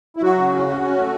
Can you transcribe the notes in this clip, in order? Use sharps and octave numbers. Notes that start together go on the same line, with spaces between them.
E4
F#3 F#4
C#3
C#4
C#4
C#4
A3